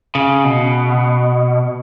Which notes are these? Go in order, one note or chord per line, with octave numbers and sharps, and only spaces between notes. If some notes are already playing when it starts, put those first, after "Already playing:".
C#3
B2